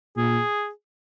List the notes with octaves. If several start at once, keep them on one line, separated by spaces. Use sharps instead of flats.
A#2 G#4